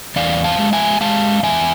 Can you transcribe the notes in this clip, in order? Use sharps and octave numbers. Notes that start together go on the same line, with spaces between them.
E2 D5 F5
F5 A5
G#3
E5 G#5
G#3 F5 A5
E2 E5 G#5